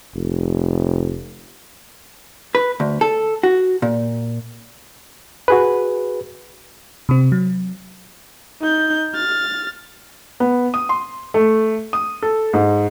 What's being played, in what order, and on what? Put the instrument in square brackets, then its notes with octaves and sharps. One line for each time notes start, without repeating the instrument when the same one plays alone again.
[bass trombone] F1
[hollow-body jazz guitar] B4
D2
A4
F#4
A#2
[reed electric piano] F#4 G#4 B4
[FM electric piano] C3 C4
F#3
[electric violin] D#4 G6
F6 A6
[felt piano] B3
D#6
C6
A3
D#6
A4
G#2